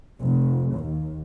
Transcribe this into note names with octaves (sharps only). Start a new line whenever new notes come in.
F1
D#2